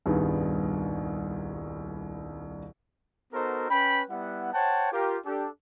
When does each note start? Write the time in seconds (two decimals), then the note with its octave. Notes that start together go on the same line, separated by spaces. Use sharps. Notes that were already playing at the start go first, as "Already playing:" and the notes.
0.06 D#1 C2 G2 D#3 B3 G#4
3.34 B3 D#4 F#4 A4 A#4 C5
3.71 C#4 B4 G5 B5
4.11 G3 B3 E4 F#5
4.53 C5 C#5 F#5 G5 A5
4.92 F4 G4 A#4
5.25 D4 G4 A4